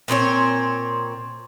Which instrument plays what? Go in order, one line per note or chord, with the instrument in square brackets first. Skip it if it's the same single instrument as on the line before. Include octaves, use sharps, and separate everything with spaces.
[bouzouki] A#2 C4 D#4 C#5